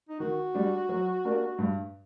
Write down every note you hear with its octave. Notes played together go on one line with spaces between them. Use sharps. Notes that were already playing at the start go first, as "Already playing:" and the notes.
D#4
D#3 F#4
G3 D4
F#3
A#3 D4 G4 A#4
G2